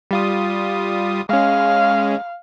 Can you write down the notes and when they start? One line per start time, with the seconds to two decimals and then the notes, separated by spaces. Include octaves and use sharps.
0.11 G3 F4 D#6
1.29 G#3 C#4 F5